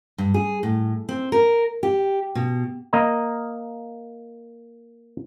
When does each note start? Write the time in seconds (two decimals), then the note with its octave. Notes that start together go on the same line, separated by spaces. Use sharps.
0.18 G2
0.34 G#4
0.63 A2
1.09 C4
1.32 A#4
1.83 G4
2.35 B2
2.93 A#3 D#5 A#5